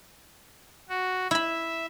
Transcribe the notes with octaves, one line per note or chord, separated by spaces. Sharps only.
F#4
E4 E5 B5